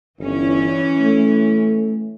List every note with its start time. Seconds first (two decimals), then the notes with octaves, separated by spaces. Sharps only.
0.19 G1 E3 C#4
1.00 A3